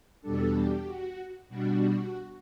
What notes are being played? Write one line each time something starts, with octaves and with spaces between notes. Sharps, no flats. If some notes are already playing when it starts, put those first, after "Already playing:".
E2 B2 G3 D4 A4
G4
F#4
B2 G3 D4 F#4